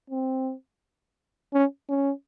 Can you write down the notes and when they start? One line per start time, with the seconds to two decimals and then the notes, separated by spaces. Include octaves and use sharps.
0.10 C4
1.54 C#4
1.89 C#4